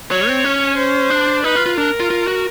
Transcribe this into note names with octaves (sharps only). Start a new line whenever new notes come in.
F#3 C#5
C4
C#4
C5
D4
D#4 B4
F4
F4
D4 A#4
F4
F4
F#4